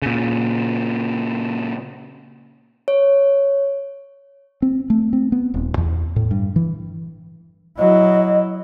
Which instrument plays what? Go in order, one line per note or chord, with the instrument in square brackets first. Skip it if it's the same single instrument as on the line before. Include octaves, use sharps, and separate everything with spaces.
[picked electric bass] A#2 C#3
[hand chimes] C#5
[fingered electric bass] C4
A3
C4
B3
D#1
E2
A2
G2
E3
[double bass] F#3 E4 [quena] D#5